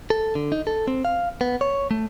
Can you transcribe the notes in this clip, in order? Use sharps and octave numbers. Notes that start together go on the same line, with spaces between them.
A4
D3
D#4
A4
C4
F5
B3
C#5
A3